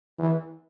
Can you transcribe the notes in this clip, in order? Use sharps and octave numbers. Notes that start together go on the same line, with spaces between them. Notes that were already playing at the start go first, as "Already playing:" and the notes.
E3